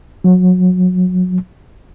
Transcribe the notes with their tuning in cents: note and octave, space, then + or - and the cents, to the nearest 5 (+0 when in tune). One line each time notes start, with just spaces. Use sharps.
F#3 -25